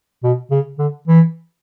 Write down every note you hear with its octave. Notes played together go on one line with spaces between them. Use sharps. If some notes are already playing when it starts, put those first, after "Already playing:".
B2
C#3
D3
E3